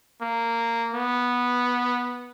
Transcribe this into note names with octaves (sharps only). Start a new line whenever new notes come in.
A#3
B3